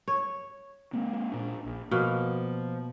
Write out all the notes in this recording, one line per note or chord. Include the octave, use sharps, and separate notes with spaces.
C#5
G#3 A#3 C4
A#2 D4
A#1
B2 F3 A#3